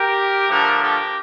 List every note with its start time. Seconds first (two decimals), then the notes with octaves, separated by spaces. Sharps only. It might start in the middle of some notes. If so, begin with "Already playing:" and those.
Already playing: G4 A#4
0.49 D3 F3 A3 G4 A#4
0.83 G4 A#4